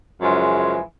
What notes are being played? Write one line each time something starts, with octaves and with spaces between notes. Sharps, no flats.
F#2 C#3 E3 F3 G#3